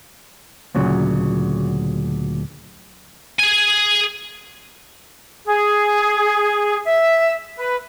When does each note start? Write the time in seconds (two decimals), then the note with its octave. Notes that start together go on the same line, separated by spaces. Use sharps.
0.75 D2 A#2 C#3 F#3
3.39 G#4 G#5
5.46 G#4
6.86 E5
7.56 B4